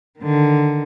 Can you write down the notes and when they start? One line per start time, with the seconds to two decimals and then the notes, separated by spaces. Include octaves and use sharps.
0.19 D3 D#3